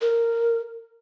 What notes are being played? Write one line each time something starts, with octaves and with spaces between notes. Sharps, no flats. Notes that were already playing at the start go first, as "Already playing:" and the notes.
A#4